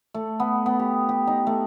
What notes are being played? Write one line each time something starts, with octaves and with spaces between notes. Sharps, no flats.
A3
B3
B3
G4
G4
D#4
A3